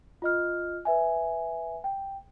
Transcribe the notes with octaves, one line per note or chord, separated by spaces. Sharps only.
F4 D#5 F6
B4 E5 G#5
G5